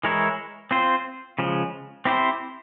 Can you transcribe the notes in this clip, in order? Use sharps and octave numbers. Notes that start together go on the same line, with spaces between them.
E3 G#3 E4 A#4 C#5
C4 F4 C5
C#3 F3 G#3
C4 E4 G4 C5